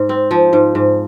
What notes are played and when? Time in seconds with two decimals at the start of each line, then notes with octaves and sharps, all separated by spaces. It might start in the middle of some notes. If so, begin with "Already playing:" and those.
Already playing: G#2
0.09 C4
0.31 F3
0.53 G#2
0.75 G#2